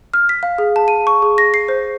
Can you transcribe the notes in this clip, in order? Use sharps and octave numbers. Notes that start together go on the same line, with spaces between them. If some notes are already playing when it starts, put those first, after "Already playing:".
F6
B6
F5
G#4
A5
D#7
C#6
G#4
A#6
C7
C5